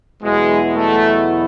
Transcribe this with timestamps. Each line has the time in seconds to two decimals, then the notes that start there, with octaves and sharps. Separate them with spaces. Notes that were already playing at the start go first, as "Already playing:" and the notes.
0.22 E2 B2 F#3 G#3 B3 E4
0.75 A3